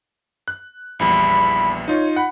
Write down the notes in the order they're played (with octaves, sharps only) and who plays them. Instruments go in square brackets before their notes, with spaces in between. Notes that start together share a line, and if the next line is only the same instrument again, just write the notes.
[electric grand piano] F#6
[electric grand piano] A#1 E2 G3 [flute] B5
[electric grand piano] D#4 F4 [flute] C#5
[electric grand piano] F#5 [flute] B5